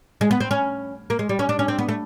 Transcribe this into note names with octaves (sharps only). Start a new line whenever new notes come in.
G#3
B3
C4
C#4
A#3
G#3
G3
C#4
D4
C#4
C4
B3
A3